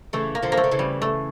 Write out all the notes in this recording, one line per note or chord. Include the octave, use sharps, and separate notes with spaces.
C#3 E3 A3
A#3
D3 F3
A#3
A3
D3
C#3 E3
G3
A3